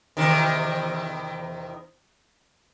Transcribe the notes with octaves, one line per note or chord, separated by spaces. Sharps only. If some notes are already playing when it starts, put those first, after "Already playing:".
E2 C3 D#3